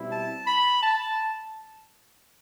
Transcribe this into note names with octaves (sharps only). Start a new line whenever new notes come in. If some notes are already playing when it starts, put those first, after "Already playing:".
Already playing: B2 G3 C4 E4
A5
B5
A5